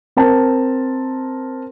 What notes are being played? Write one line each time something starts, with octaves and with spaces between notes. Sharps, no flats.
C4 A#4 A5